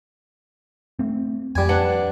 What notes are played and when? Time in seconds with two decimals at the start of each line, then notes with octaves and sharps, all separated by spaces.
0.99 A3 C4
1.55 F2 G3 G#5
1.69 D4 B4 F#5